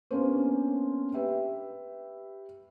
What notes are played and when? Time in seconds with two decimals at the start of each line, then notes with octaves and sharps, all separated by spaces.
0.11 A#3 B3 C#4 D4 G4 C5
1.14 G4 B4 E5 G5